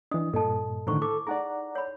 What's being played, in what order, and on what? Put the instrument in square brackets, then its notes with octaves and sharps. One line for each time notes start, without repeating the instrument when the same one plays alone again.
[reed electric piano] E3 D4 [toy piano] D#5 D#6
[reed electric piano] G2 A#2 [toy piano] A4 D#5 A5
[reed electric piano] A2 D3 D#3 [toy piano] E4 C5 C#6
[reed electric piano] A4 [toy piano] D6
[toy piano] D#4 G#4 [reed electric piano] D5 F#5 A#5
[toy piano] C#5 B5